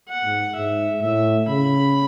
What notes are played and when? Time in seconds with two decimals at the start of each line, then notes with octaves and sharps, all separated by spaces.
0.09 F#5
0.24 G#2
0.55 G#2 E5
1.02 A2 E5
1.48 C#3 B5